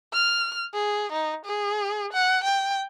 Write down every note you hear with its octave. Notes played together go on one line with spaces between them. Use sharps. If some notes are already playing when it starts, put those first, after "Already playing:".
F6
G#4
D#4
G#4
F#5
G5